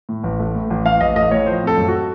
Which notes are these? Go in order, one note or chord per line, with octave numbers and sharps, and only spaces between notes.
A2
A1
A3
A2
A1
A1 F5
A1 D#5
A3 D#5
A2 C#5
F3 C5
C4 A4
F#2
F#4